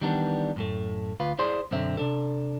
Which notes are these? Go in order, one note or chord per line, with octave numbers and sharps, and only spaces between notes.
D#3 E3 G3 B3 D4
F#2 A2 A3
D2 F4 B4
E4 G#4 C5 D5 C6
B1 F#2 D3 C4 E5
C3 D4 A4